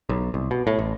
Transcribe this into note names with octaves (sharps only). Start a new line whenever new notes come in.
B1
C2
B2
A2
A1